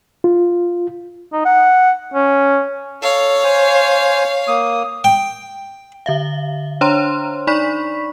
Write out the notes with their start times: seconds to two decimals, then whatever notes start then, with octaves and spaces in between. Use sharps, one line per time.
0.24 F4
1.33 D#4
1.45 F#5
2.14 C#4
3.02 A4 C#5 F5
3.44 C5 G#5
4.48 A#3 D#6
5.04 G5
6.06 D3 E5 F5
6.81 D4 C5 C#5 A#5 C6
7.47 D#4 D5 B5 C#6 B6